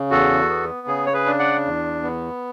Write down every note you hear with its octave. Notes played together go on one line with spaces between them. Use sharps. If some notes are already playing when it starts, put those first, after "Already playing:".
Already playing: C#3
E2 F#4 A4
B3
C#3 G#4
C#5
G#4 B4
D4
D5 F#5
E2
B3